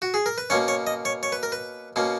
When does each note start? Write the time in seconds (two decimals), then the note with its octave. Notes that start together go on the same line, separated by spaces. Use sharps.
0.02 F#4
0.14 G#4
0.26 A#4
0.38 B4
0.50 B2 A#3 C#4 C#5
0.68 C#5
0.87 D#5
1.05 C#5
1.23 C#5
1.32 B4
1.43 A#4
1.52 B4
1.96 B2 A#3 C#4